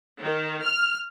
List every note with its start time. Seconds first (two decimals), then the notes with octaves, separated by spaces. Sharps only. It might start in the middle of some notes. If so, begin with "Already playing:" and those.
0.21 D#3
0.62 F6